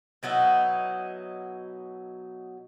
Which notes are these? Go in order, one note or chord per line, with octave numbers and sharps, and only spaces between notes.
B2 F#3 D#4 E4